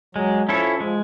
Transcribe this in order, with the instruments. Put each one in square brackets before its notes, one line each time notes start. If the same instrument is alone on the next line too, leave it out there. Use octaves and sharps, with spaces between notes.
[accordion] F#3 [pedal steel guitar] G#3
[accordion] F3 [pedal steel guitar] C#4 E4 A4 C#5
[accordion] F3 [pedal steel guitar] G#3